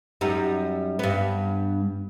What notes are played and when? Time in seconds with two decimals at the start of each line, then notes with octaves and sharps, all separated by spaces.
0.21 F#2 G3 D#4
0.99 G2 B3